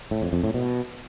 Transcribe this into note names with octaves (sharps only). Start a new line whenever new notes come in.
A2
F2
F2
A2
B2